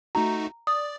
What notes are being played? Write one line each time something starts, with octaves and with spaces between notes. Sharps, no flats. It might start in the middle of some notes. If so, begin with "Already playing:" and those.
A3 D#4 F#4 A#5
D5 D#6